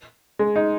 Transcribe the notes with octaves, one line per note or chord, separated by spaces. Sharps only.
G#3
D#4